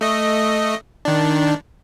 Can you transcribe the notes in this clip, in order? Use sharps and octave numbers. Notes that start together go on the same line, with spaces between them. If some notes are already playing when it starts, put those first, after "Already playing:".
A3 D#5
D#3 D4